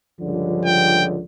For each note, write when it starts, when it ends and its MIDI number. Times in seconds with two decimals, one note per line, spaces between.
0.20 1.20 37
0.20 1.20 43
0.20 1.20 50
0.20 1.22 53
0.65 1.04 79